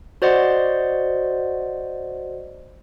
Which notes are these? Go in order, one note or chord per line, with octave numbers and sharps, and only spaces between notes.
F#4 C5 D5 D#5 F#5 C6